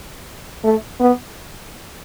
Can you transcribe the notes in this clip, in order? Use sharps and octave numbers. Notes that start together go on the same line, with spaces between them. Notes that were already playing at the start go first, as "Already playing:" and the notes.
A3
B3